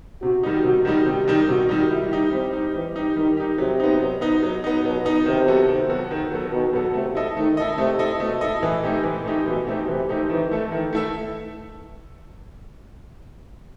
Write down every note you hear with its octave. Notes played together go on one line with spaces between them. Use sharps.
C3 F#4
D#3 G3 D#4
C3 F#4
D#3 G3 D#4
C3 G4
D#3 G3 D#4
C3 F#4
D#3 G3 D#4
G3 E4
D#4 G4
G3 C4
D#4 G4
E3 G3
D#4 G4
D#3 G3
D#4 G4
C3 F#3
B3 D#4
F#3
B3 D#4
F#3
B3 D#4
B2 F#3
B3 D#4
C3 D#3
F#3 B3 F#4 A4
D#3
F#3 B3 F#4 A4
D#3
F#3 B3 F#4 A4
B2 D#3
F#3 B3 F#4 A4
C3 A3
E4 A4 D#5
D#3 A3
E4 A4 D#5
C3 A3
E4 A4 D#5
B2 A3
E4 A4 D#5
E3
A3 C4 D#4 G4
E3
A3 C4 D#4 G4
B2 E3
A3 C4 D#4 G4
C3 E3
A3 C4 D#4 G4
D#3 E3
A3 E4 A4 E5
D#3 E3
A3 E4 A4 E5